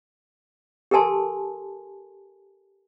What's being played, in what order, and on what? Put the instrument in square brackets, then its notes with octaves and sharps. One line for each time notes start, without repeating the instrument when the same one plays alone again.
[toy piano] G4 A4 A#4 G#5 A5 C6